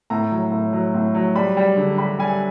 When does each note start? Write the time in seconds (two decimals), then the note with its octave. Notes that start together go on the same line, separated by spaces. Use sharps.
0.10 A2 A#5
0.32 F#3
0.52 A2
0.73 F#3
0.94 A2
1.15 F#3
1.35 G3 B5
1.57 G3
1.77 D3
1.98 G3 B5
2.19 G3 G#5